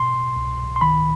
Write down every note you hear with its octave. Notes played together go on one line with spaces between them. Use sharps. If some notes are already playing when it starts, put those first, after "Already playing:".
Already playing: B2 C6
C2
C6
D#3 B5